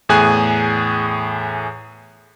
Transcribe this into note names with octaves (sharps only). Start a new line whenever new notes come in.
E2 A2 G#4 G#5 F#6